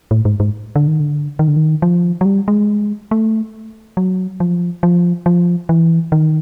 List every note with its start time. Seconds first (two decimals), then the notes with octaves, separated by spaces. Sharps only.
0.11 A2
0.25 G#2
0.40 G#2
0.76 D3
0.87 D#3
1.00 D3
1.39 D#3
1.48 D3
1.56 D#3
1.82 F3
2.21 F#3
2.25 G3
2.48 G#3
3.11 A3
3.97 F#3
4.40 F3
4.83 F3
5.26 F3
5.69 E3
6.12 D#3